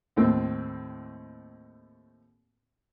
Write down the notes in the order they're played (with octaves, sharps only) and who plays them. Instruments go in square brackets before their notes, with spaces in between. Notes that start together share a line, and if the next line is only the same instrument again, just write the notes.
[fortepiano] D#2 A2 C4